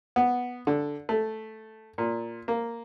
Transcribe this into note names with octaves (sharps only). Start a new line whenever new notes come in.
B3
D3
A3
A#2
A#3